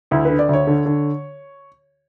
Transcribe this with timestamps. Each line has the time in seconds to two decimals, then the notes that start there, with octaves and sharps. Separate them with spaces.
0.11 D2 E4
0.25 D3 B4
0.39 D5
0.49 D2 C#5
0.67 D3
0.86 D3